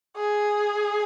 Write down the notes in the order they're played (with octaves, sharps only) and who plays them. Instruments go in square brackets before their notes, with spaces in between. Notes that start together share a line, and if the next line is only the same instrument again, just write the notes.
[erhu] G#4